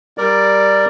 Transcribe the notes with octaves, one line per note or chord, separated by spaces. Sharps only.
G3 A#4 D5